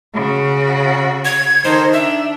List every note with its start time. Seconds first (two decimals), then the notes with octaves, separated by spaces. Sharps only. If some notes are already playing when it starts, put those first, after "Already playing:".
0.15 C#3 F#4
1.25 G#6
1.64 D#3 A4 C5
1.93 D4 E5